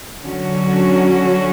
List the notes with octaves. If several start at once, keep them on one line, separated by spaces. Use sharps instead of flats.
D3 F#3 C#4 F#4